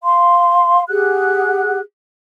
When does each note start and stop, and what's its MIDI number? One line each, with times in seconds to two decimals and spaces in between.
0.04 0.83 77
0.04 0.83 84
0.89 1.79 67
0.89 1.79 68
0.89 1.79 78
0.89 1.79 90